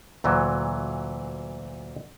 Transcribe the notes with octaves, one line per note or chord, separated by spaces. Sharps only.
D2 A#2 E3 F#3